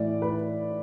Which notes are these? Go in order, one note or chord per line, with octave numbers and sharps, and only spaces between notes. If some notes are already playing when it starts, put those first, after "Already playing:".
Already playing: A2 E3 D5
B4